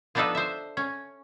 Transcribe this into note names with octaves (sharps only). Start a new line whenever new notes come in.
F3 B3 D4 D#4 A4 B4
C5 E5
C#4